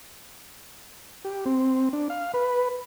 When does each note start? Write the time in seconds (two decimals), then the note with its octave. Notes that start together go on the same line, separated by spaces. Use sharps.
1.25 G4
1.46 C4
1.93 D4
2.10 F5
2.34 B4